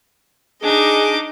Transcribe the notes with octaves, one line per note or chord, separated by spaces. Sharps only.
D4 D#4 G#4 D#5 D6